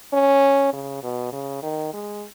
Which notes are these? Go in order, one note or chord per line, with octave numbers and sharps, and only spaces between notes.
C#4
C#3
B2
C#3
D#3
G#3